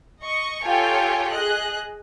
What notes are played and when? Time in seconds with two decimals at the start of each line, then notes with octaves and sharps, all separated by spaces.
0.23 D#5 C#6
0.63 F4 G4 A4 C#5 G5 G#5
1.30 G#4 D#5 F#6